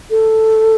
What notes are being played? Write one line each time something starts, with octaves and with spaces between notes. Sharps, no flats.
A4